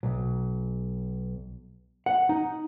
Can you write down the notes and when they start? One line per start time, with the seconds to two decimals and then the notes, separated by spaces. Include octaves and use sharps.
0.03 B1
2.06 F#5
2.29 D#4